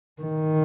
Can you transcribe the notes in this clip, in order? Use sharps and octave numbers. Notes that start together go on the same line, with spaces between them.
D#3